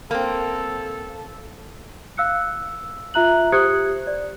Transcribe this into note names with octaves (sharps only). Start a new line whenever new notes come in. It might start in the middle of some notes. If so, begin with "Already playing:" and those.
A#3 C4 A4
F5 E6 F#6 C#7
F4 E5 A#5 F#6 F#7
G4 C5 D#6 F#6 G#6 C#7
D5